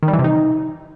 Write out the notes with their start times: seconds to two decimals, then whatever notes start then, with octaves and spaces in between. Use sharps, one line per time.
0.03 D#3
0.08 G3
0.13 E3
0.19 C3
0.24 D#4